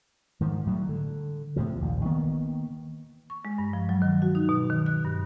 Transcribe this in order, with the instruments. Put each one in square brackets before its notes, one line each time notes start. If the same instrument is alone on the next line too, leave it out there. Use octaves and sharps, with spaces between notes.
[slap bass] G#2 D#3 F3
A2 F#3 G3
D3
A2 C3 F3
A#1 D#2
D#3 A#3 B3
[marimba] C#6
G#3
G2
F3
F#3
D#3
F#4
D#4
B2
D#3
F#6
G2